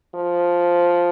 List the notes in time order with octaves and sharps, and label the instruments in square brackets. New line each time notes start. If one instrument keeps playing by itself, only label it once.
[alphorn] F3